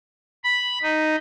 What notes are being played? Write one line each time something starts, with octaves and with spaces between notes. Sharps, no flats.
B5
D#4